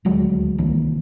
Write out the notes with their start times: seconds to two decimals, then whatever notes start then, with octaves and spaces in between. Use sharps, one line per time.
0.05 D#1 D2 F#3 G#3
0.58 C2 D#3 E3 A#3